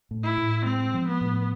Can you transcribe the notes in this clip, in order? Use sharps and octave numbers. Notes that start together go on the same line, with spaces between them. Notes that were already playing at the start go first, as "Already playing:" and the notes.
A2
E4
A2
G#3 C4
F3
B3
A2